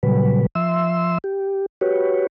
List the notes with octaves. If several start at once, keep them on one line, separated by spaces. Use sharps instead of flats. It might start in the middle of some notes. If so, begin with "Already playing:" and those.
A#2 C#3 F#3 G3 B4
F3 E5 C6 E6
G4
F#4 G4 B4 C#5